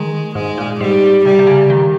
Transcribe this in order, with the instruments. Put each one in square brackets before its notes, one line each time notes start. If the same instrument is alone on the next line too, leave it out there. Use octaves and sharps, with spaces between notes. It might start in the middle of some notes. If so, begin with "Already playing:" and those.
Already playing: [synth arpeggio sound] D#3 [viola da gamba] G#3
[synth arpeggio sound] G#2 [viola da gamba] G#3
[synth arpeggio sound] A#2
[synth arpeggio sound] G#2 [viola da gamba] G3
[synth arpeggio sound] C3 [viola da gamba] G3
[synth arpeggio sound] C3
C#3
D#3